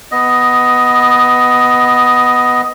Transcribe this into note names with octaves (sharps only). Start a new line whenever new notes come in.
B3 D#5